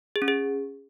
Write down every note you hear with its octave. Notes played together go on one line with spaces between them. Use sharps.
G#4
C#4
G#4